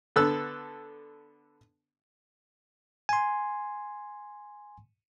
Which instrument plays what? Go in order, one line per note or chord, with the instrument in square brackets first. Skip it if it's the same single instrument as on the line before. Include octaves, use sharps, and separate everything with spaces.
[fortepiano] D3 B3 A4 E6 F#6
[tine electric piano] G#5 C6